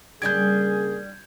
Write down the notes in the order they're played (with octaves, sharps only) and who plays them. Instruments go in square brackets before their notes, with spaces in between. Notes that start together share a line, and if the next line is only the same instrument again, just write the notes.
[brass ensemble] C#3 A#3 G#4 [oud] G3 D4 G4 [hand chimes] G6 G#6